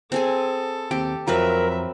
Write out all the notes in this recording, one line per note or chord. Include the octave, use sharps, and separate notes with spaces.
C4 G#4 A4 G#5
D#2 C4 G4 G5
F2 F#3 C4 F4 A#4 B4 E5